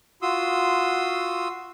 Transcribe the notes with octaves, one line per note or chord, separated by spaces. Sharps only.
F4 F#4 C6 D#6 E6